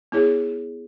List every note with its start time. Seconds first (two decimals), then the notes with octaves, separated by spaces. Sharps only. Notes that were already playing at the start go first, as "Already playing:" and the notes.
0.12 B3 E4 G#4 C#5